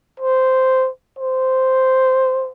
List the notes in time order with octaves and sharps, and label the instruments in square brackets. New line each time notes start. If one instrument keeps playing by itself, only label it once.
[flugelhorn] C5
C5